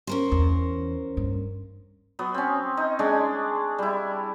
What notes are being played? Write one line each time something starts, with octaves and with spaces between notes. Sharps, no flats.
C#4 A#4 C5
E2
G2
F#3 B3
C4 C#4
D#4
G#3 C#4 D4 G#5
G3 E4